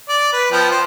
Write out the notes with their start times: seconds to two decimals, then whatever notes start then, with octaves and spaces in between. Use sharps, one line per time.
0.09 D5
0.33 B4
0.52 F3 B3 G5
0.71 C5